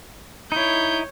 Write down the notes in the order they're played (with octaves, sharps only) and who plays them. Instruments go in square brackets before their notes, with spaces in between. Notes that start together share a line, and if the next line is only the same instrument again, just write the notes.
[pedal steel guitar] D#4 E4 [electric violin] C#5 G6